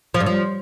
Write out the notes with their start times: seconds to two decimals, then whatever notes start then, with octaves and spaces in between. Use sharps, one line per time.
0.14 F3
0.20 G2
0.26 F3